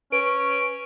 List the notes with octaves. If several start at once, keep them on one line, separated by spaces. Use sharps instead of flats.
C#4 B4 D7